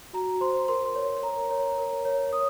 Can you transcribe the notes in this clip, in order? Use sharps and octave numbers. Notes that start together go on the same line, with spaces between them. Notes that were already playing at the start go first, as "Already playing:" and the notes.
F#4 A#5
C5 C6
A#4 C6
C#5
A#4 A#5
C#5
A#4
C#5
C#5 D#6